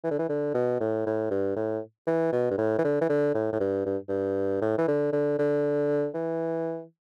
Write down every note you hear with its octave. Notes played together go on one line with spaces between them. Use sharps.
E3
D3
E3
D3
B2
A2
A2
G2
A2
E3
B2
G2
A2
E3
D3
E3
D3
A2
A2
G2
G2
G2
A2
E3
D3
D3
D3
E3